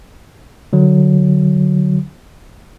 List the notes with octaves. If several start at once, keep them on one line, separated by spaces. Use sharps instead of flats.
D3 F#3